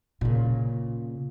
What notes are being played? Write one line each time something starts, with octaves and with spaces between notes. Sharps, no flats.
A#2 C#3